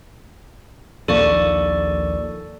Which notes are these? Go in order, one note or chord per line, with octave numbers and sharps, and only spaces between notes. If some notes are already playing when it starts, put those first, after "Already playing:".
A#1 D#2 A#3 A4 D5 C#6